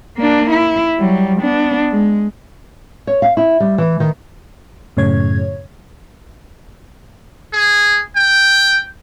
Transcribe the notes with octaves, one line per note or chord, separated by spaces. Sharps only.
A#3 D4
E4
F#3 G3
B3 D4
G#3
C#5
F5
E4
G3
E3
D#3
F#2 A2 C#3 C#5 G#6
G#4
G5